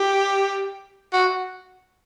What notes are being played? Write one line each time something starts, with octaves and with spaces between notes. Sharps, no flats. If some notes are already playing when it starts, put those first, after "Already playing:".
Already playing: G4
F#4